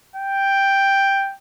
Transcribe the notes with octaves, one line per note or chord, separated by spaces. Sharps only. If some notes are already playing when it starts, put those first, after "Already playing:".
G5